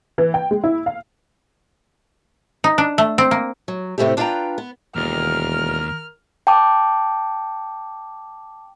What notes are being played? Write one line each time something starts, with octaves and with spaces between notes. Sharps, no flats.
E3
G5
G#3
E4
F5
D#4
D4
A3
C4
A#3
F#3
A2 C3 A3 C4 E4 G4
D4 F4 B4 E5 G5 A#5
B3
E1 D#2 A#4 F6
G5 A5 D6